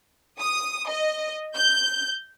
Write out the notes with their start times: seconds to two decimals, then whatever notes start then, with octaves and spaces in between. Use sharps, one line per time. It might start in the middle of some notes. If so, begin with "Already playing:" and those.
0.39 D#6
0.88 D#5
1.55 G6